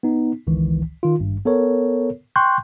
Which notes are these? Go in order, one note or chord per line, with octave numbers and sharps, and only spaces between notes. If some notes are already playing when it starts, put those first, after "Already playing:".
B3 D#4
G1 C#2 D#3 E3
D#3 F4
G#1 G2
B3 A4 A#4 C#5
G5 C6 C#6 F#6 G6